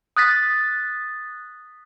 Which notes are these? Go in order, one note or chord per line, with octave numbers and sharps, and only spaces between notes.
D#6 F#6 A6 B6